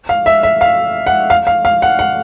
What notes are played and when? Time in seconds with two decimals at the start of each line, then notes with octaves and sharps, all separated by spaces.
0.09 F5
0.26 E5
0.43 E5
0.61 F5
1.07 F#5
1.30 F5
1.47 F5
1.65 F5
1.82 F#5
1.99 F#5